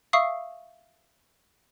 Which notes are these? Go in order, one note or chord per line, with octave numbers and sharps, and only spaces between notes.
E5 F5 C#6 D#6 E6 C7